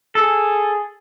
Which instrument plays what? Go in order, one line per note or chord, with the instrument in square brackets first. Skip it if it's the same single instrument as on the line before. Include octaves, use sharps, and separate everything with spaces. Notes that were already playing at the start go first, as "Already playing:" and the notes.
[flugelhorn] G#4 [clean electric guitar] A4